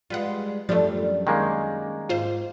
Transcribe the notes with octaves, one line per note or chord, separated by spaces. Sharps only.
G3 G#3 F4 B4 F#5
F#2 F3 G3 A3 D4
D#3 G#3 A#3
G#2 F4 C5 F5